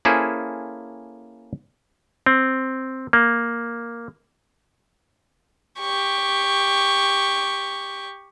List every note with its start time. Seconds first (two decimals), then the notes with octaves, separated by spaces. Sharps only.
0.05 A#3 C#4 E4 G#4 A4 C5
2.26 C4
3.13 A#3
5.80 G4 C#6